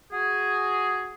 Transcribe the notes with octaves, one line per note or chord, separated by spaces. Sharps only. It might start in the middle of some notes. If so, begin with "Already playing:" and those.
F#4 G#4